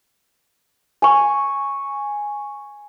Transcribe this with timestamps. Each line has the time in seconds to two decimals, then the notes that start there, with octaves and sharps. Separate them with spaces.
1.02 G#5 C#6